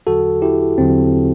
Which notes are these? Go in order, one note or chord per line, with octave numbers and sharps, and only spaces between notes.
E2 D3 F#3 F#4 A4
E4 G4
E2 D3 F#3 C4